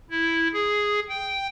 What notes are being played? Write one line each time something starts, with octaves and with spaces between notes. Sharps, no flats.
E4
G#4
G5